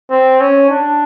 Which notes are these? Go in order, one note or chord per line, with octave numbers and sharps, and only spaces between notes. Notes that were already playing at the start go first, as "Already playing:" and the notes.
C4
C#4
D4